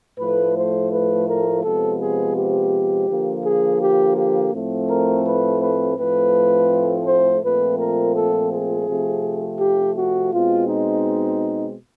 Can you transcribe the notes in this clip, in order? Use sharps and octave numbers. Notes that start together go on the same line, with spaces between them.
A2 F3 A3 B4
C5
B4
A#4
C3 F3 G#3 B3 A4
G#4
G4
D3 F3 A#3
G#4
G4
G4
A2 F3 A3 C4
A#4
B4
B4
A2 F3 A3 C4 B4
C5
A#2 F3 A3 C4 B4
A#4
A4
G#4
C3 F3 A3 C4
G4
F#4
B2 G#3 C4 F4
D#4